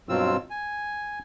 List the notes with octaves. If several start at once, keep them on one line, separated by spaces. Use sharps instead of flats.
G2 B2 F#3 C4 F4 E6
G#5